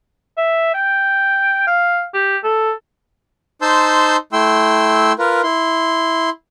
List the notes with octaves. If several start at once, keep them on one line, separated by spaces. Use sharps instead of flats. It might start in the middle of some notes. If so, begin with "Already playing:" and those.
E5
G5
F5
G4
A4
D#4 C5 A5 C6 E6 G6
A3 E4 G5 C6 E6
F4 A#4 B4
E4 C6